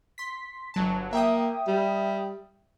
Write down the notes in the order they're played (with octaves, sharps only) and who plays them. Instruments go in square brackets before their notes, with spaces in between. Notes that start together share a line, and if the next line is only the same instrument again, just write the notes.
[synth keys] C6 B6
G1 F#3 A5
[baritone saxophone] A#3 [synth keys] E5 G5 D#6
[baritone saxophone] G3